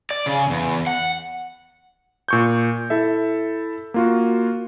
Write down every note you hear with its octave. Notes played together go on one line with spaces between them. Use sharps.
D5
C#3
E2
F#5
A#2 C#6 G6
E4 A4 E5
A#3 F4 F#4